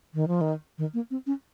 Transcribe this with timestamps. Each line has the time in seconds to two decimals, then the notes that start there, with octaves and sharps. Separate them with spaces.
0.14 D#3
0.28 F3
0.41 D#3
0.78 D#3
0.94 A#3
1.11 C4
1.27 C#4